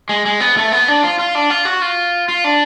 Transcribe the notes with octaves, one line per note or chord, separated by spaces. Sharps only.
G#3
G#3
B3
A3
B3
D4
F4
F4
D4
F4
F#4
F4
F4
D4